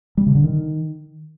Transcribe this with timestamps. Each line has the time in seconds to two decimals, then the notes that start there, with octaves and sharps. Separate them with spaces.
0.17 G3
0.26 C#3
0.35 D3
0.44 D#3